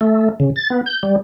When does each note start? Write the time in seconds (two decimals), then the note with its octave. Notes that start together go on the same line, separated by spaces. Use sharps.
0.01 A3
0.40 C#3
0.56 A6
0.70 B3
0.86 G6
1.03 G3